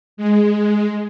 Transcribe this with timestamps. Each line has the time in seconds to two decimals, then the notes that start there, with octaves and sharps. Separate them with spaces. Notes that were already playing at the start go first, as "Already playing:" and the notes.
0.17 G#3